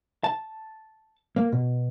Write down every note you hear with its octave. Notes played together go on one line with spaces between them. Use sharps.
A5
A#3
B2